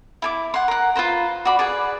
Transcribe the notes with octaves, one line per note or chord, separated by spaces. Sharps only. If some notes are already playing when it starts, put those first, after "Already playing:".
E4 G#5 D6
F#5 C6
A#4 F#5
F4 B4 C5 A#5
F#4 D5 B5
G#4 B4 D5